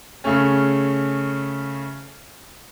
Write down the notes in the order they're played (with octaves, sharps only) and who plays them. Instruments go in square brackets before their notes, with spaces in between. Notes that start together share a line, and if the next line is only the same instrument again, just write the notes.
[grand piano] C#3 A3 C#4